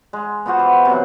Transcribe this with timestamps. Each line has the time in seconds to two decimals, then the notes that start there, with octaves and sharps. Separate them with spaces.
0.13 G#3
0.46 B3 F4 F#4 C5
0.59 E3
0.85 C3 F#3